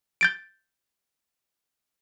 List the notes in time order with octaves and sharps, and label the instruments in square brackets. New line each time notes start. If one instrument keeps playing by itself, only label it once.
[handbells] G6 A6 D7